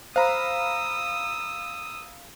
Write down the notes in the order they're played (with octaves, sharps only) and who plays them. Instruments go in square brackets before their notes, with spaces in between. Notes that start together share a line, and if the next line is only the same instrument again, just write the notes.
[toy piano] C5 [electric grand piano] F5 A#5 B5 [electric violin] D#6 E6